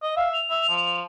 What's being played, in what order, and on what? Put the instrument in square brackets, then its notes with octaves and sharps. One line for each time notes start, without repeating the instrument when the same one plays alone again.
[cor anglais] D#5
[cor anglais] E5 [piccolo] F5
[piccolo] F7
[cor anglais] E5
F3